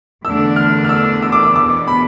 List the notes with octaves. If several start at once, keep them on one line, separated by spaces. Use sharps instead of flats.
E2 D3 A3 D4 E6
F6
F6
E6
E6
D6
E6
E2 B2 B3 D6
B5